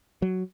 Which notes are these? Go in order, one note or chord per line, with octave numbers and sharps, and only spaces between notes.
F#3